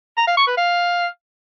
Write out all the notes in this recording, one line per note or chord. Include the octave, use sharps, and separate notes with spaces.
A#5
F5
C#6
B4
F5